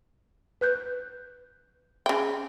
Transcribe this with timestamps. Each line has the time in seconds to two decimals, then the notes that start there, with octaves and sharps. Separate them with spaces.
0.61 B4 F#6 G6
2.06 C#3 G5